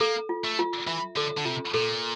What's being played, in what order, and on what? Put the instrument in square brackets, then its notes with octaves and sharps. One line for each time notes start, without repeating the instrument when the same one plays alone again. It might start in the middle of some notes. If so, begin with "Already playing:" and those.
[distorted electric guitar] A#3 [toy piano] A4
[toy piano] F4
[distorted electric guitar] A3
[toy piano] F4
[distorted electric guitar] E3 [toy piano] E5
[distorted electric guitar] D3 [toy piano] A4
[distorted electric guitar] D3
[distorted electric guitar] C3 [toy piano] F4
[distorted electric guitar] A#2 [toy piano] A4